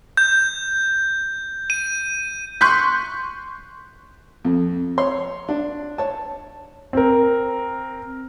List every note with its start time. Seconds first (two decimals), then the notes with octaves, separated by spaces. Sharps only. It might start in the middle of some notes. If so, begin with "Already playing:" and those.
0.17 G6
1.70 D#7
2.61 C6 C#6 F#6 G6 B6
4.45 F2
4.98 C#5 C6
5.49 D4
5.98 C#5 A5
6.93 C4 A#4